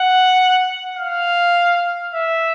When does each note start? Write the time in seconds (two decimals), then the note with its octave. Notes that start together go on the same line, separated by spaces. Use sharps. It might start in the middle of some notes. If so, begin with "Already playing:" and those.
Already playing: F#5
0.97 F5
2.14 E5